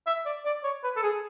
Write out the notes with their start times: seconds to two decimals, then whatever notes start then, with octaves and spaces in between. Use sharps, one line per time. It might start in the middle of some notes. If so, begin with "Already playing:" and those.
0.07 E5
0.25 D5
0.45 D5
0.64 C#5
0.84 B4
0.96 A4
1.03 G#4